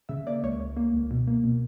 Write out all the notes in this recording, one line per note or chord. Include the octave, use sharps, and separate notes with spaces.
C#3 E5
A#3 D5
C#2 C#5
C#2
A#3
C#2
B2
A#3
B2